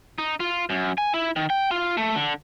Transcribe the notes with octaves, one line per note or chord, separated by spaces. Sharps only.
D#4
F4
F#2
G#5
E4
D#3
G5
F4
A3
D3